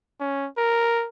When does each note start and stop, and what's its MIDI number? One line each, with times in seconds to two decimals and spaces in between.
0.20 0.48 61
0.57 1.07 70